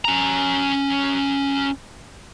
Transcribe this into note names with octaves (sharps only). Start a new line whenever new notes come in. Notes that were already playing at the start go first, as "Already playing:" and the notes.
C#4 A#5